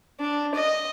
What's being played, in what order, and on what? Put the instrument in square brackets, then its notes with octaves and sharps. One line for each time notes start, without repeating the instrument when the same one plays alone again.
[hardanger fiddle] D4
D#5